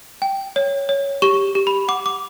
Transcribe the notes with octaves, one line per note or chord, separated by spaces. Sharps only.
G5
C#5
C#5
G4 C#6
G4
B5
F#5 D6
D6